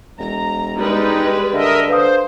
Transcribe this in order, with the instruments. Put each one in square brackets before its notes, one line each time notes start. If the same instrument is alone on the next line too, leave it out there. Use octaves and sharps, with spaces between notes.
[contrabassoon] E1 [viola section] A#5
[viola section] G3 G#3 B4 [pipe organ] D#4
[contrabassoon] D3 [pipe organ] A#4 D#5 E5
[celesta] B4 F5 D#6 [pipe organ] C5